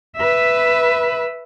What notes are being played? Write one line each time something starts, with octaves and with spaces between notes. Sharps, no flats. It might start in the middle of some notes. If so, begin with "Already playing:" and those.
B4 E5